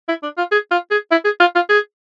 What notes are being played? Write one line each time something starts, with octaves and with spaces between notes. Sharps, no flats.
E4
D4
F4
G#4
F4
G#4
E4
G#4
F4
F4
G#4